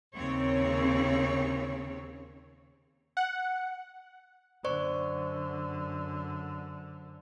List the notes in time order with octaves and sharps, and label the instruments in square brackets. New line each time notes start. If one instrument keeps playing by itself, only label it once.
[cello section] D#2 C#3 C4 C#5
[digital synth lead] F#5
[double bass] F#2 D3 [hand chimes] C5 D5 C#6